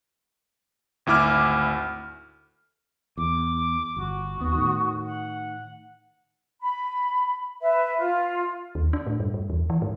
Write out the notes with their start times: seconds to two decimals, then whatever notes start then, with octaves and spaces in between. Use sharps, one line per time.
1.06 G#1 D2 E4 D6 F6
3.17 E2 D6
3.97 G1 F#4
4.40 D#2 B3 D#6
4.55 A2 D#3
5.05 F#5
6.60 B5
7.61 B4 E5
7.98 F4
8.75 D#2
8.93 D4
9.06 A2
9.20 G2
9.34 G2
9.50 E2
9.70 E3
9.82 G#2